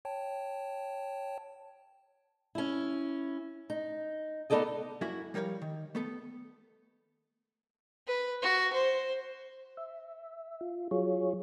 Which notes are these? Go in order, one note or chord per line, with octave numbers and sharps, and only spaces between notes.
C#5 G5 A5
C#4 E4
D#4
B3 D#4 A4 D5 D#5
F#2 A#3 E4 F#4
F3 G3 A#4 C#5 F5
D#3
A3 B3 A4
B4
F#4
C5
E5
F4
F#3 F4 G#4 C#5